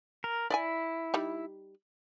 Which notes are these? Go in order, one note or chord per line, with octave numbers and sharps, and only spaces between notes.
A#4
E4 D5 D#5 G#5
G3 D#4